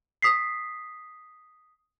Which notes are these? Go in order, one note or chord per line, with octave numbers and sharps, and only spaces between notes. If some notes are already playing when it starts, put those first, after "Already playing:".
D#6 B6 C7